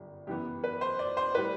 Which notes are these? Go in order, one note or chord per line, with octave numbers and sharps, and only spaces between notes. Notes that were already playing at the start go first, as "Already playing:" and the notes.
Already playing: G1 F#2 G3
F#2 E3 B3 G4
B4
C5
D5
C5
A2 G3 B4